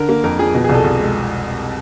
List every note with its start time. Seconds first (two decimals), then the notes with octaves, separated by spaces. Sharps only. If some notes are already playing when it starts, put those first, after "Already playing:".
Already playing: D3 A#4
0.09 A#3
0.24 F2 A#4
0.39 F3 G#4
0.54 B2
0.64 G#4
0.69 C2
0.74 A4
0.84 C2
0.99 G#3